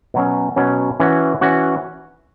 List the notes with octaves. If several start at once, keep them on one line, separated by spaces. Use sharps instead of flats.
B2 F#3 C#4
B2 F#3 C#4
E3 C#4 F#4
E3 C#4 F#4